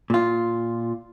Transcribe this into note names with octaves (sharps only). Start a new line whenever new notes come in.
A#2 F4